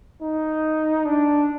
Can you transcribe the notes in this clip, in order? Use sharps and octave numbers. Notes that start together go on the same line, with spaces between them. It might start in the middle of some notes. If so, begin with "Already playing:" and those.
D#4
D4